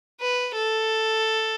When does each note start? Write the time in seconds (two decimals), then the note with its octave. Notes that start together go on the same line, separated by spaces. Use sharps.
0.20 B4
0.55 A4